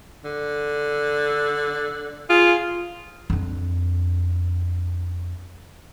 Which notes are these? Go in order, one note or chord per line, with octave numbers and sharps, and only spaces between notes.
D3
F4 G#4
F2 D4